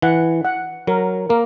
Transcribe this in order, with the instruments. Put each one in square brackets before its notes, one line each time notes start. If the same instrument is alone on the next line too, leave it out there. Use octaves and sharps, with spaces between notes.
[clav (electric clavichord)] E3 [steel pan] F#5
[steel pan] F#5
[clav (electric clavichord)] F#3 [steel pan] A#4
[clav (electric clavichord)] A#3 [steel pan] A#4